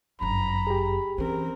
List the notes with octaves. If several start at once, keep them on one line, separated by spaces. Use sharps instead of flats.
G1 F#2 A#5 B5
G4 G#4
E3 C4 C#4 A#4